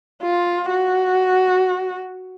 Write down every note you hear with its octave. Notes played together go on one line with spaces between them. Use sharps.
F4
F#4